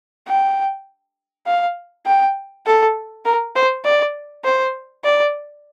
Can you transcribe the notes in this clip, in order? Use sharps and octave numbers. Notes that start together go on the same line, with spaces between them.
G5
F5
G5
A4
A#4
C5
D5
C5
D5